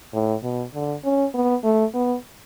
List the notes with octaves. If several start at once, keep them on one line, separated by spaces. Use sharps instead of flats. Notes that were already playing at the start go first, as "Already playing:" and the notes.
A2
B2
D3
C#4
B3
A3
B3